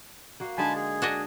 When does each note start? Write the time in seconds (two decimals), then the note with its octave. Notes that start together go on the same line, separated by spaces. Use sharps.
0.40 A#3 F#4 F5
0.58 D3 G#3 D#4 G#5 A5 B5
0.75 G#4
1.02 D4 F#4 D#5